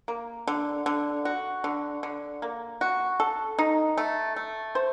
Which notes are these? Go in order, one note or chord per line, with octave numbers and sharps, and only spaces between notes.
A#3
D3
D3
F#4
D3
D3
A#3
F#4
A4
D#4
A3
A3
C5